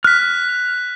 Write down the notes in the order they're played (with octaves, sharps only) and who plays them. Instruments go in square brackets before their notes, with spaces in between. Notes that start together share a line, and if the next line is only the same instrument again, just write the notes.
[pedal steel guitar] F6 [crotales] F#6 B6